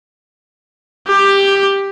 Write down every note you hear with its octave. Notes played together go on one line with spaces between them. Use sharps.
G4